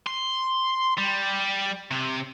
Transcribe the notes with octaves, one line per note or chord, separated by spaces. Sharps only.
C6
G3
C3